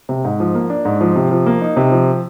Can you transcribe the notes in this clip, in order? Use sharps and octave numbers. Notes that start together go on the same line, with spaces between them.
C3
G#2
F3
A#3
D4
G#2
F3
C3
F3
A#3
D#4
C3
F3